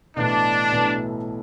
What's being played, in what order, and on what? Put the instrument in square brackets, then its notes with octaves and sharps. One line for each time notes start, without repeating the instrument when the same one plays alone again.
[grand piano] B1 A2 E3 A3 [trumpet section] D4
[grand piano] B1 A2 E3 A3